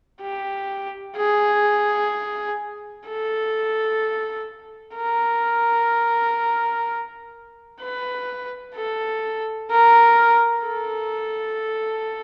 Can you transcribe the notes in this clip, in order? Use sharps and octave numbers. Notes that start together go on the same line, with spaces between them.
G4
G#4
A4
A#4
B4
A4
A#4
A4